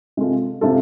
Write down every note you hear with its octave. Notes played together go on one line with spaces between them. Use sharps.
C3 G#3 C4 F4 A4
C3 G#3 C4 F4 A4